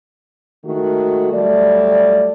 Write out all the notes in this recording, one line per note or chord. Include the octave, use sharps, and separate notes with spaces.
D#3 G#3 A3 F#4
F#3 G3 A3 D5